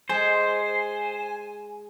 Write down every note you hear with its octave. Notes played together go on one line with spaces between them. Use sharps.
G#3 C5 G#5